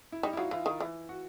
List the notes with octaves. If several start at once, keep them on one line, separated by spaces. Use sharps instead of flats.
E4
G3 D#4
E4
F#3 F4
E3 F4
D#3
E3
F#4